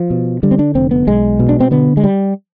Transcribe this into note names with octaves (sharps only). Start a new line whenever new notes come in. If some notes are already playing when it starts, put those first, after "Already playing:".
Already playing: F3
B2
D3 G3
C4
D4
F1 C4
B3
B1 G#3
B2
D4
C4
D3 B3
G#3
G3